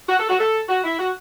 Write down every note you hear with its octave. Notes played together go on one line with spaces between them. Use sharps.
F#4
A4
F#4
A4
F#4
E4
F#4